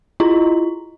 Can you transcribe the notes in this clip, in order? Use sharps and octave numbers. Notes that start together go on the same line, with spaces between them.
E4 F4 D#5 A#5